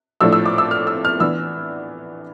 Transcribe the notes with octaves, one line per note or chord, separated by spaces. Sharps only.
A2 F3 A3 D4 E6
E6
D6
E6
F6
E6
F6
E3 B3 D4 E6